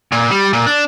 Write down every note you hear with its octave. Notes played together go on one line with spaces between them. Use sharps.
A#2
G3
A#2
D4